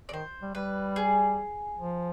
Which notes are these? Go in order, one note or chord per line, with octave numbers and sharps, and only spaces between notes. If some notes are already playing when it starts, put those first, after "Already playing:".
D5
D#3 C5
G3
G3 B4
G#4
F3